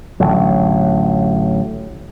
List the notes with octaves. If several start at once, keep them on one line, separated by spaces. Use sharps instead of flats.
A1 D3 F#3